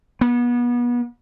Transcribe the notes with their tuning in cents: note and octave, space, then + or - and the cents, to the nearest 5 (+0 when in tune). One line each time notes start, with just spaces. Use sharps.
B3 -35